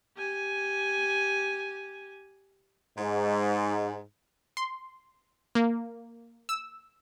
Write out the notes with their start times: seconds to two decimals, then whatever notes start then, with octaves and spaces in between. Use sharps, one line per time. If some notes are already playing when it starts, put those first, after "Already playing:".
0.17 G4 G#5
2.98 G#2
4.57 C6
5.55 A#3
6.49 E6